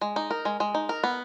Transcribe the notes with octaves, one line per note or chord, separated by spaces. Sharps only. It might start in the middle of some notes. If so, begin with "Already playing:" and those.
G#3
D#4
A#4
G#3
G#3
D#4
A#4
B3